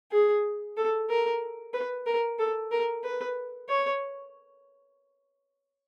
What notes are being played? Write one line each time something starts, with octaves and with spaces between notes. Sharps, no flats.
G#4
A4
A#4
B4
A#4
A4
A#4
B4
C#5